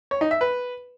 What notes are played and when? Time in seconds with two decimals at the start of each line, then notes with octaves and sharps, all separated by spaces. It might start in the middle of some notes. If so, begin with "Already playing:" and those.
0.11 C#5
0.21 D#4
0.31 E5
0.41 B4